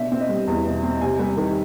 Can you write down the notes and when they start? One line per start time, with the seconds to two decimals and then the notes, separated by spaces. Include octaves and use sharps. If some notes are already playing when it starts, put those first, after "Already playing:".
Already playing: B2 D4 E5
0.12 C4
0.21 D#5
0.29 G3
0.47 E2
0.65 B2
0.83 C4
1.01 C3 G#5
1.19 G3
1.37 D#3